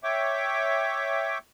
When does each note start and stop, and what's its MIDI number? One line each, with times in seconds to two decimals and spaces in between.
0.04 1.38 73
0.04 1.38 76
0.04 1.38 79
0.04 1.38 86